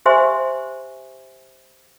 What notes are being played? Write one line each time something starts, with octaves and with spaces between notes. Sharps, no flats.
G4 C5 E5 G#5 C6